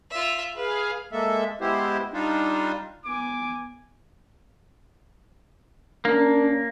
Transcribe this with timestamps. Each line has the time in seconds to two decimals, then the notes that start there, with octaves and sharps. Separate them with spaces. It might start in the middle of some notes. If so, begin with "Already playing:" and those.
0.10 F4 E5
0.56 G#4 B4 F5
1.12 G#3 A#3 A4 E5
1.61 G#3 B3 E4 G4 C5
2.13 G3 D4 D#4 F4
3.06 B3 G#5 D6
6.05 A#3 C#4 D4 A#4